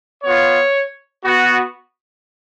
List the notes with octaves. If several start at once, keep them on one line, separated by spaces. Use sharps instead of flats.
B3 F4 C#5
B3 F#4